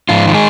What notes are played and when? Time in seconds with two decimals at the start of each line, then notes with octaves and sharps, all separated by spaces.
0.09 G#2 F3 F4
0.26 D#3
0.34 G#3 G#4